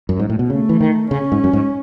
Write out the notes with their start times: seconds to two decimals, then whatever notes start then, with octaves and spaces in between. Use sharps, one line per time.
0.09 F#2
0.19 G#2
0.30 A2
0.39 B2
0.50 C#3 A3
0.69 E3
0.81 D#3
1.11 C#3 C#4
1.32 G#2
1.44 F#2
1.53 G#2